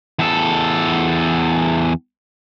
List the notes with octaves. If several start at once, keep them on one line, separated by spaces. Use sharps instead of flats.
E2 A4